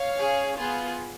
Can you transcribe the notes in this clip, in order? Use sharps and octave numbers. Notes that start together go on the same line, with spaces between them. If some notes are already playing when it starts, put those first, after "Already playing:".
Already playing: C#5 F5
C#4 G#4
B3 F4 G#4